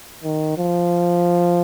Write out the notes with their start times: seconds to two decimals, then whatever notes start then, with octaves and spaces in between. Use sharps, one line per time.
0.24 D#3
0.58 F3